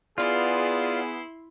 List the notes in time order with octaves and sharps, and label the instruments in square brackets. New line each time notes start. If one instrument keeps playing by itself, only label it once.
[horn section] B3 G#4 [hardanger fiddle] E4 C6 [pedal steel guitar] F4 [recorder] D5